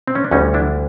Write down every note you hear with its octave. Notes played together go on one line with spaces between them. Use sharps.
C4
C#4
D4
D2 D3 G3 C#4 D#4
D4 E4